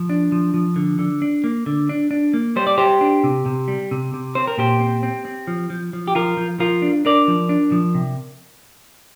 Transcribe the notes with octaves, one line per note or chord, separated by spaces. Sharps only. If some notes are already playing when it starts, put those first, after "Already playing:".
Already playing: F3
D4
F3
F3
D3
D3
D4
A#3
D3
D4
D4
A#3
G3 C5
D5
G3 G4 C5
D4
C3
C3
G3
C3
C3
C4 C5
A#4
A#2 G4 C5
C4
C4
C4
F3
F3
F3
G4
F3 F4 A#4
F3
F3 F4 A#4
D4
D4 A#4 D5
F3
D4
F3
C3